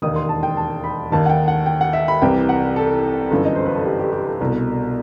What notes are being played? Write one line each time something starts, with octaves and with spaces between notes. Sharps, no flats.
E1 D#2 D#3 D#6
C6
A5
G5
A5
B5
D#2 D#3 A5
F#5
G5
F#5
G5
F#5
E5
B5
C2 C3 E3 G5
F#5
A4
G1 F#2 E3
D#5
C5
B4
A4
G4
G4
G4
A4
C2 B2